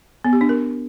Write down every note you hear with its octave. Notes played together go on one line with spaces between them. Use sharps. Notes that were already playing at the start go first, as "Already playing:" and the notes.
B3
G4
D4
A#4